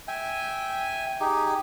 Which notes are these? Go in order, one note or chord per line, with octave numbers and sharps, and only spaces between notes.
E5 G5 G#5
D#4 G4 G#4